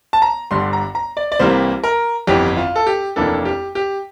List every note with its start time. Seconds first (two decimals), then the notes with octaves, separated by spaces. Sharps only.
0.13 A5
0.22 A#5
0.51 G1 G2 D3 C6
0.73 A#5
0.95 A#5
1.17 D5
1.32 D5
1.39 C2 C3 E3 G3 A#3 C5
1.84 A#4
2.27 G1 F2 E3 G4
2.57 F4
2.76 A4
2.87 G4
3.16 F1 F2 E3 A#3 D4 A4
3.45 G4
3.75 G4